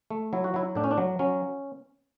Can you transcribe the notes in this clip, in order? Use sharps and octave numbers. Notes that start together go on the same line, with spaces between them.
A3
F#3 E4
F#4
F#3 E4
A2 D4
C#4
D4
F#3
F#3 C#4